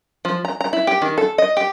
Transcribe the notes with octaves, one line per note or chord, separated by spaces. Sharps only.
F3
A#5
A#5
E4
G4
D#3
A4
D#5
G4